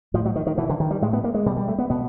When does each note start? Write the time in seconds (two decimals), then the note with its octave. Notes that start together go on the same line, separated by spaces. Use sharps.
0.14 A2 F3
0.26 F#3
0.36 D#3
0.47 D#3
0.58 B2 E3
0.69 D3
0.80 D#3
0.91 G3
1.02 A2 G#3
1.13 B3
1.24 A#3
1.34 G#3
1.46 B2 G3
1.57 G3
1.68 A3
1.78 B3
1.90 B2 B3